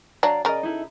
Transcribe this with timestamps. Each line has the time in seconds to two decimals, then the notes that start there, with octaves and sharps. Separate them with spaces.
0.23 F#3 D4 D5 F5 A#5
0.45 C#3 A#4 D5 D#5
0.63 D#4 E4 A4